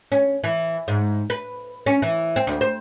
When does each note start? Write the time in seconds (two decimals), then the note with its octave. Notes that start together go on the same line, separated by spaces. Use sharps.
0.12 C#4
0.44 E3
0.88 G#2
1.30 B4
1.86 C#4
2.02 E3
2.36 C4
2.47 D2
2.61 C5